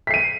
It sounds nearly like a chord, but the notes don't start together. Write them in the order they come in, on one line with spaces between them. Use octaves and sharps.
B6 C7 D#7